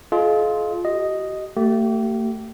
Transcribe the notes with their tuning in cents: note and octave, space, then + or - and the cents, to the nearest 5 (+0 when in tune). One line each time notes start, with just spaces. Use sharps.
F4 +0 G#4 +45 D#5 +0
G4 -45 D#5 +0
A3 +35 G4 -30